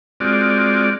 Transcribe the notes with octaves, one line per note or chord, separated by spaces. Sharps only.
G#3 C4 F4 F#4 D5